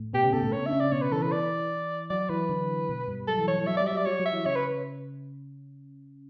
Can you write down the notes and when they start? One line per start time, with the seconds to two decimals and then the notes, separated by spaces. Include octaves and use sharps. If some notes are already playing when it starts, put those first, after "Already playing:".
Already playing: A2 A3
0.13 B2 B3 G4
0.23 C#3 C#4
0.33 B2 B3 A4
0.43 A2 A3
0.53 C#3 C#4 C#5
0.66 D4 E5
0.73 C#3 C#4
0.80 D5
0.92 B2 B3 C#5
1.02 B4
1.12 E3 E4 A4
1.22 B4
1.32 D5
2.10 F#3 F#4 D5
2.29 E3 E4 B4
2.49 D3 D4
2.89 B2 B3
3.08 G2 G3
3.27 F#3 A4
3.38 E3
3.48 C#5
3.57 E3 E4
3.67 F#3 F#4 E5
3.77 D5
3.81 G3 G4
3.87 E5
3.93 F#3 F#4 D5
4.06 F#3 F#4 C#5
4.19 F#3 F#4
4.26 E5
4.32 E3 E4
4.46 C#3 C#4 C#5
4.56 B4